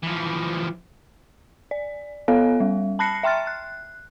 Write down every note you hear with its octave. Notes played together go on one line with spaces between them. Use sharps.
E3 F3
D5
B3 A4 C#5 F5
G3
A5 B5 F#6 A#6 C7 C#7
E5 G5 C6 F6 A6
F#6